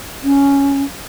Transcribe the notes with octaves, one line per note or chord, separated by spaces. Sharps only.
C#4